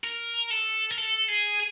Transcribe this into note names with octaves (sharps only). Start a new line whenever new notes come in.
A#4
A4
A#4
A4
G#4